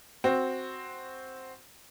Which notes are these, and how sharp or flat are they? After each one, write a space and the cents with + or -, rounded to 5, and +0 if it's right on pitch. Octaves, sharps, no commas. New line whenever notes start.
C4 +0 F#4 +0